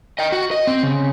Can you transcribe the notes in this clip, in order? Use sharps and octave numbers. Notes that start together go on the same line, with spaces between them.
D#5 G5
F#4
D#5
C4
C#3